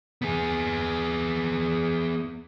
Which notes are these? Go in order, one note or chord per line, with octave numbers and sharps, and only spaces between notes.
B3 G#4